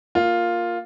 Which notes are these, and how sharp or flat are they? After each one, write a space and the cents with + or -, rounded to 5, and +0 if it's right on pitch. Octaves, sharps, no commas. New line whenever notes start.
A#3 +0 F4 +5